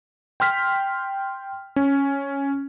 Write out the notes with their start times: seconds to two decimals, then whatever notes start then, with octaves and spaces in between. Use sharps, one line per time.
0.40 G5 C6 F6 B6
1.76 C#4